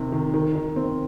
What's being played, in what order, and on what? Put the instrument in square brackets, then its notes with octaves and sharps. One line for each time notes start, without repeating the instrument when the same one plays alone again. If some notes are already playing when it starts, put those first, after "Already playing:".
Already playing: [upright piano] C3 D#3
D#3
D#3
D#3
C4